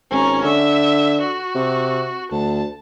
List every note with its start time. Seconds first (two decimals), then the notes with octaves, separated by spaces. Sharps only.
0.11 G#1 C#4 A#5
0.44 D3 E5
1.21 F#4
1.55 C3
2.31 D2 A5